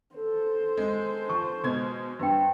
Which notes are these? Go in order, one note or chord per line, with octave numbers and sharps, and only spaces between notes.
A4 C5
G#3
F3 A5 C#6
B2 G#3 G#6
G2 B4 G5